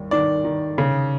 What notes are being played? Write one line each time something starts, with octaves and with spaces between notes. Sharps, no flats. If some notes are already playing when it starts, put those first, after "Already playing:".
Already playing: D#2 G3
D#3 D5
D#3
C#3